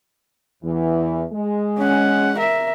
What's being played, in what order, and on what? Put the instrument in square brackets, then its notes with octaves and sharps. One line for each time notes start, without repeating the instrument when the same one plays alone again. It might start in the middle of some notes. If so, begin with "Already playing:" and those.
[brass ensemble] E2 E3
G#3
[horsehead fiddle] C#4 F#5
A#4 E5